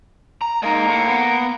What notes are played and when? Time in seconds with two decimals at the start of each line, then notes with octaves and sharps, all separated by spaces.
0.41 A#5
0.63 G#3 A#3 D#4
0.88 A2
1.09 B3